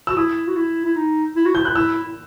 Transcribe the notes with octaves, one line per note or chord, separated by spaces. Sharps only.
F#4 E6
E4 D#6
F#4
E4
E4
D#4
E4
F#4
E4 G6
F#6
E4 E6